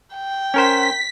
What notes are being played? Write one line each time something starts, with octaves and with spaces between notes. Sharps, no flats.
G5
C#4 A#4 C5 B6